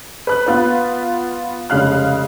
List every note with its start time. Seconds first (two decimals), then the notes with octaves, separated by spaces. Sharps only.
0.27 B4 F#6
0.46 B3 F4 B4
1.70 F1 C#3 G#3 F5 F6 F#6